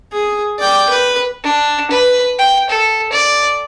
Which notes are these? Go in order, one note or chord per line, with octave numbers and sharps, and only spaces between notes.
G#4
D5 G5
B4
D4
B4
G5
A4
D5